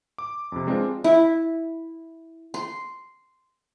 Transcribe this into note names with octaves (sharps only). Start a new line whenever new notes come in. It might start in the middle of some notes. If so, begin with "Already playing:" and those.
D6
F2 C3
G#3 C4 D4 F4 B4
E4
C6